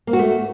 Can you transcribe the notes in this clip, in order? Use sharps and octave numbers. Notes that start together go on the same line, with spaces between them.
A#3
F#4
A3